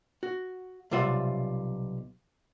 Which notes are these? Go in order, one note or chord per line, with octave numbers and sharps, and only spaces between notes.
F#4
B1 C3 G3 F4 E5 F#5